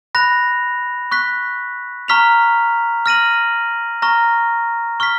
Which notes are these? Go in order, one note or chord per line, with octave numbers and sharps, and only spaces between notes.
B5 F#6 A#6 F7
C#6 F#6 B6
A#5 C#6 F6 B6 F7
F6 A#6 D#7 F#7
A#5 C#6 F6 A#6
C#6 F6 B6